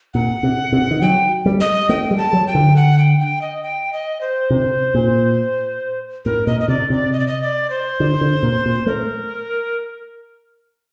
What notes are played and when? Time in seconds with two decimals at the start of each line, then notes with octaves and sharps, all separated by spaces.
0.14 A#2 F#5
0.43 C3
0.73 C3
0.91 D#3
1.02 F#3 G5
1.46 G3
1.61 D#5
1.89 A3 G5
2.11 G3
2.18 A5
2.33 F#3
2.47 G5
2.55 D3
2.76 F#5
2.99 G5
3.20 G5
3.42 D#5
3.63 G5
3.93 D#5
4.21 C5
4.50 C3
4.95 A#2
6.25 A2 A#4
6.47 A#2 D#5
6.61 D#5
6.68 C3 D5
6.90 C3 D5
7.13 D#5
7.20 D5
7.27 D#5
7.42 D5
7.70 C5
8.00 D3
8.21 D3
8.43 A#2
8.66 A#2
8.86 A3 A#4